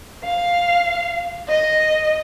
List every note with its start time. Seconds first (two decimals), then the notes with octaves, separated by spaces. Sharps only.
0.24 F5
1.49 D#5